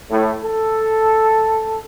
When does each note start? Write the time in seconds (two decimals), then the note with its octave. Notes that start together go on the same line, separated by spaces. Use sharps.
0.10 A2
0.43 A4